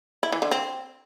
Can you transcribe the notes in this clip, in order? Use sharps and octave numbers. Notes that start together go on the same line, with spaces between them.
E4
E3
D3
C4